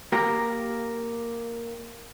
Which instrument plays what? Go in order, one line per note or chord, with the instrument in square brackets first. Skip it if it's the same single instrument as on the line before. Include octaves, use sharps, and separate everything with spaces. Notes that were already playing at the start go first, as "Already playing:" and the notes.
[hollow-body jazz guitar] A#3 G4 A#4